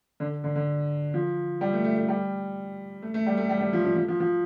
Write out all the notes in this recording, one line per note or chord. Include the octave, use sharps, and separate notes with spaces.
D3
D3
D3
F3
G3
A3
A3
A3
G3
A3
A3
G3
A3
G3
G3
F3
F3
F3
F3
F3